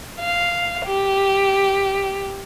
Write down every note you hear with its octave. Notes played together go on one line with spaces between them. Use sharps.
F5
G4